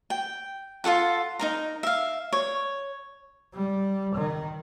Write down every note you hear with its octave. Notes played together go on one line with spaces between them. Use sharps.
G5
F4 F#4 A4 F#5
D#4 A#4 A#5
E5 F5
C#5
G3
D#3